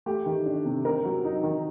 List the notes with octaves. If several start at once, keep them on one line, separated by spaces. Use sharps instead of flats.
A3 G4
D#3
D4
C3
C4 A#4
F#3
D#4
D#3